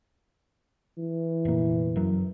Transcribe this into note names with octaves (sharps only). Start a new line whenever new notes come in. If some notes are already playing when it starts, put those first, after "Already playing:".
E3
F1 A#2
F#1 F#2 F#3